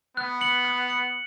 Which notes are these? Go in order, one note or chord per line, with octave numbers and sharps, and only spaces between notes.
B3 F#6
C#7 F#7
F#6
C#7 F#7